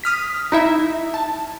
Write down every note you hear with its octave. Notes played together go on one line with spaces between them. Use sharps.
D#6 F6 B6
D#4 E4 E5
A5